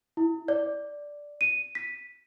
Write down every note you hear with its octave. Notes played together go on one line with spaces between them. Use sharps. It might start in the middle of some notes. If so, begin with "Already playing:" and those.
E4
D5
D#7
B6